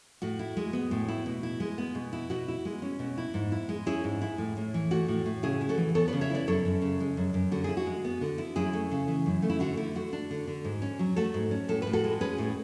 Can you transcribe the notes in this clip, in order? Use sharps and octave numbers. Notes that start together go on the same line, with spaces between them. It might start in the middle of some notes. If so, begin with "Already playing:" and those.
A2 F#4
E4
G#3
B3
A2
E4
B2
E4
G#3
B3
B2
E4
B2 F#4
E4
G#3
C#4
B2
E4
G#2
E4
G#3
C#4 E4 G#4
G#2
E4
A2
A2
E3
A3 F#4
A2
A2
C#3 E4 G#4
E4
F#4 A4
E3
B3 A4 C#5
C#3 B4 D5
C#5 E5
E4 B4 D5
F#2 A4 C#5
F#2
C#3
G#3
F#2
F#2
D3 F#4
E4 G#4
F#4
G#3
B3
D3
E4
F#2 E4 G#4
A3
C#3
E3
F#2
A3
E4
D3 F#4
D3 E4
A3 F#4
D4
D3
D3
G#2
C#4
F#3
A3 F#4 A4
G#2
C#4
A2 A4
A2 B4
F#4 A4
G#3
C#4 G#4 B4
A2